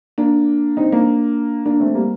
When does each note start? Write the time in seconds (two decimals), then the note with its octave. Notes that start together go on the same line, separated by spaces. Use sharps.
0.18 A#3 D4
0.77 C4 D#4
0.92 A#3 D4
1.65 A#3 D4
1.80 A3 C4
1.95 G3 A#3